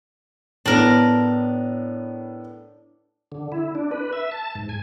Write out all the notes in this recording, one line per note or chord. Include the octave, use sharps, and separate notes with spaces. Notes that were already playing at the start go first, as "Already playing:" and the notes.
A2 B3 D4 A#4
D3
E4
D4
B4
E5
A5
G#2
G#5